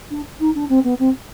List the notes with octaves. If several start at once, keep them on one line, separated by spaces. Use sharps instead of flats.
D4
D#4
D4
C4
B3
C4